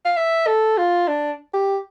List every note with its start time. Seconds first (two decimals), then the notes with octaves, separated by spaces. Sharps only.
0.05 F5
0.17 E5
0.47 A4
0.78 F4
1.08 D4
1.54 G4